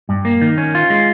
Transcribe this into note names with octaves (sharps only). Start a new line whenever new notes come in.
G2
A#3
D#3
C#4
F4
G#3